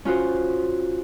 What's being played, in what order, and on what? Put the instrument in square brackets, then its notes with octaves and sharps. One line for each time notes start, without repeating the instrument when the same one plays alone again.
[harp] C#4 F4 F#4 C5